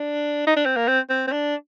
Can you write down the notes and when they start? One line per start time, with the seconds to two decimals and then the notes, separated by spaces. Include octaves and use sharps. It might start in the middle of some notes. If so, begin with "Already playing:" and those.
Already playing: D4
0.47 D#4
0.57 D4
0.65 C4
0.77 A#3
0.88 C4
1.10 C4
1.28 C4
1.32 D4